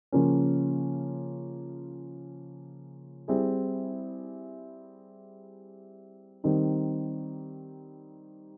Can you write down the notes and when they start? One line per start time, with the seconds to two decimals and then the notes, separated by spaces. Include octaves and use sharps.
0.12 C#3 F3 A#3 C#4
3.28 G3 C4 E4 G#4
6.44 D#3 G3 C4 D#4